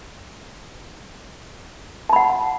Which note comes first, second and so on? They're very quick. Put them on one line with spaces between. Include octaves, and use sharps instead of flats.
A5 B5 F#5